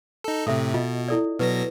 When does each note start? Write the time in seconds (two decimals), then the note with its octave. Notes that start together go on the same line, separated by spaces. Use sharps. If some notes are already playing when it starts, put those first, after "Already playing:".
0.24 D#4 A4
0.47 A2 C3 A4 E5
0.74 B2 F4 D#5
1.08 E4 A4 D5
1.40 B2 F#3 B4 A#6